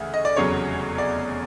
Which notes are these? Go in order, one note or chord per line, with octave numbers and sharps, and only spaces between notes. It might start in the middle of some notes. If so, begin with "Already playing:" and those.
Already playing: D2 C#3 E3
D#5
D5
F1 E2 C#3 F#3 C#5
D5